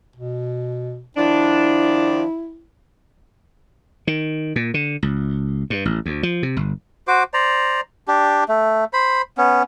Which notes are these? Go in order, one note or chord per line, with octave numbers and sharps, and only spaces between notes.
B2
D#3 F3 D4 E4
D#3
A#2
D3
C#2
G2
A1
D2
F3
C3
G1
F#4 C5 D6
C5 D5 A#5
D4 G4
A3
C5 B5
B3 C#4